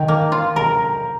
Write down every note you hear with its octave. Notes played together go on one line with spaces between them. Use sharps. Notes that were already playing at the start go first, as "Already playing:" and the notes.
Already playing: D#3 G5
A#3
F4
A#4 A#5